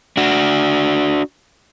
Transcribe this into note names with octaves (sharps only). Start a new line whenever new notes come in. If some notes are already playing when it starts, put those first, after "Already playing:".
D4 F#4